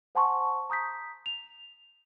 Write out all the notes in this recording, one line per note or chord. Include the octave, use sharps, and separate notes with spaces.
C5 F#5 G#5 A5 C6 C#6
A#5 D#6 G6 B6
F7